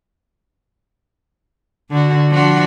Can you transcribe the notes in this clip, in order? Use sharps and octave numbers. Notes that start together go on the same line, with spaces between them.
D3 F#4
F3 D4 F#4